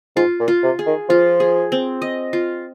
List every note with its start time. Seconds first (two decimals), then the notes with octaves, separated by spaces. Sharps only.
0.16 G#2 F4
0.40 A#2
0.48 F4
0.63 C3
0.79 G#4
0.86 D#3
1.09 F3 F4
1.40 G#4
1.72 C4
2.02 D#5
2.33 F4